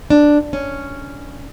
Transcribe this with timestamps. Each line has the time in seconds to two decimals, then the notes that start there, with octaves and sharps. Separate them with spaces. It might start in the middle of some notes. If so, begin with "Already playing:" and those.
0.10 D4
0.53 C#4